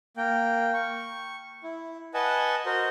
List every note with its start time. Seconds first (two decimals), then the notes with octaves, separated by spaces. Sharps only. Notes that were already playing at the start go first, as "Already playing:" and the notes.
0.17 A#3 G5
0.74 C#6
1.64 E4
2.14 B4 D#5 F#5 G#5 A5
2.66 F#4 A#4 C5 D#5